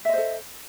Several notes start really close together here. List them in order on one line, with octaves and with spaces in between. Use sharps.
E5 D#5 C5 A4